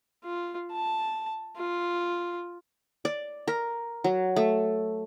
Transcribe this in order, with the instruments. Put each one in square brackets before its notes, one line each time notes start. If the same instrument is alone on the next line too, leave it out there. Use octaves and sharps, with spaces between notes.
[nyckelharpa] F4
A5
F4
[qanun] D5
A#4
F#3
A3